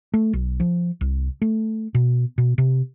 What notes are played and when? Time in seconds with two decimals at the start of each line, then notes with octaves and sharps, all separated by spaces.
0.14 A3
0.33 B1
0.60 F3
1.01 C2
1.42 A3
1.94 B2
2.38 B2
2.58 C3